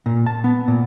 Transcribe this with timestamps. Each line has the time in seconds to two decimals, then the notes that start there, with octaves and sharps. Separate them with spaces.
0.06 A#2
0.26 A5
0.44 B3
0.68 A#2